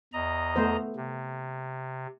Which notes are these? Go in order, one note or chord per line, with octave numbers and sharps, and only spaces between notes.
E2 D#5 A#5
A3 B3 C5
C3